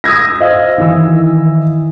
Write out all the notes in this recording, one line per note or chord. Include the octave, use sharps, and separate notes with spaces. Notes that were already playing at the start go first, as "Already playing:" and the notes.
D#6 E6 G#6 A#6
C5 D#5 F5
D#3 E3 E6